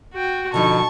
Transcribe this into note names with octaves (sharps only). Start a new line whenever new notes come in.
F#4 G5
B2 D3 F3 D#4 A5 C#6